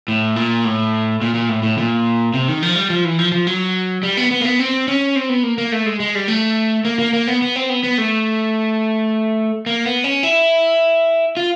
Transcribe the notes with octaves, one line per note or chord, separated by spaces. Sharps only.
A2
A#2
A2
A#2
A#2
A2
A2
A#2
C3
D#3
F3
G3
F3
E3
F3
F3
F#3
G3
B3
B3
A#3
B3
C4
C#4
C4
B3
A#3
A#3
A3
G#3
G#3
G3
A3
A#3
A#3
A#3
B3
B3
C4
B3
B3
A3
A#3
B3
C#4
E4
F4